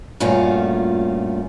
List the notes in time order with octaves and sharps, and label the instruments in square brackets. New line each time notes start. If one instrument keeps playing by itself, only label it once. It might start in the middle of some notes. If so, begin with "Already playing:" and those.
[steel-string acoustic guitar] G2 A#2 A3 C#4 F4 F#4